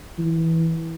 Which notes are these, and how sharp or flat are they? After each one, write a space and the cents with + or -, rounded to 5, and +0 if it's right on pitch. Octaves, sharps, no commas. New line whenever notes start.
E3 -10